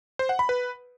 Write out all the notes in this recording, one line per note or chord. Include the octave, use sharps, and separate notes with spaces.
C5
F#5
B5
B4